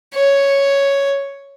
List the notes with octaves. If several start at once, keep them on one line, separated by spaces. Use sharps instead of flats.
C#5